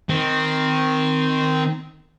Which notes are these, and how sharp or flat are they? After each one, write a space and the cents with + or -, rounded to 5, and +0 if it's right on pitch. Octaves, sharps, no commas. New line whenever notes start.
D#3 +0 C4 -10